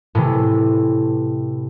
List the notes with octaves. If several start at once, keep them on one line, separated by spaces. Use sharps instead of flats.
A2 C3 E3